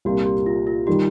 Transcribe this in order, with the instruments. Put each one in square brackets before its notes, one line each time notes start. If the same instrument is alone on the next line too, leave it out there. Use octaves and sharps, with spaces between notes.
[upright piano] C2 A#2 A#3 F4 [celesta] G4
[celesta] G4
F4
F4
[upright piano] D#3 G3 D#4 [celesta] G4